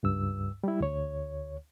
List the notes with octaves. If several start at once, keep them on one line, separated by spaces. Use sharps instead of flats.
C#2 G2 E6
G3 E4
D2 C#5